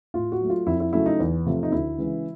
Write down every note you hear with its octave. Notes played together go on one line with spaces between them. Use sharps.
A2 F4
F#4
F#3 A3
F4
F2 E4
E4
C#3 F#3 A3 E4
D#4
E2
C3 F3 A3
D#4
D2 E4
C#3 E3 G#3